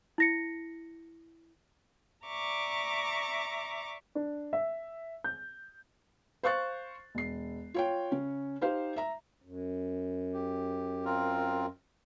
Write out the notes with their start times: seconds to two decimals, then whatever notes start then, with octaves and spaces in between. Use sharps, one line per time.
0.18 E4 A#6 C#7
2.27 D5 E5 A#5 C#6 D6
4.15 D4
4.53 E5
5.24 G6
6.43 C5 F5 C#6 F#6 A6
7.15 E1 C7
7.74 F4 C#5 G5
8.12 C#3 C#4
8.61 D#4 G4 C5 F5
8.96 E5 A#5
9.42 F#2
10.34 G4
11.05 C4 F4 A#4